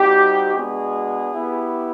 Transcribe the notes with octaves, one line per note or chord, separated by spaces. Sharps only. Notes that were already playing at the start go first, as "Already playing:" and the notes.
Already playing: G3 C4 D#4 F#4 G4
G#3 B3 D4 F#4 G#4
B3 E4 G4